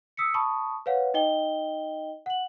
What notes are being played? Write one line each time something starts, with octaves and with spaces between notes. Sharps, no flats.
D#6 E6 B6 C#7
A5 B5 C#6 D#6
B4 C#5 F5 F#5
D#4 D#5 G5 G7
F#5 F#7